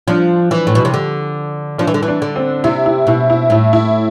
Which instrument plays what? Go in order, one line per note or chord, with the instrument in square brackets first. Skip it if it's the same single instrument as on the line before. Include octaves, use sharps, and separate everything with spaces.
[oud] F3 [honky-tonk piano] D4
[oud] E3
A2
B2
C3
D3
[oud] F3 [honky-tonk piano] D4
[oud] E3
D3
E3
[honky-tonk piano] D4
[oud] D3
[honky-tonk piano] C4
[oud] C3 [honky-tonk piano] E4
[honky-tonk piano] E4
[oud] B2 [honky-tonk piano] E4
[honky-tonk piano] E4
[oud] A2 [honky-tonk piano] E4
[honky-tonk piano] E4